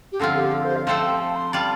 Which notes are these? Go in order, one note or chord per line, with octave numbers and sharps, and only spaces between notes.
G4
D3 F3 C4 F4 A4
G4
A4
C5
F5
F3 A3 C4 A4 C5 F5
G5
A5
C6
G3 F4 D5 A5